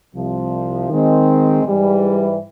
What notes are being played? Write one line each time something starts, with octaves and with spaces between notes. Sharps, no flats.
C2 C3 F3
D#3 G#3 C4
G#2 E3 G3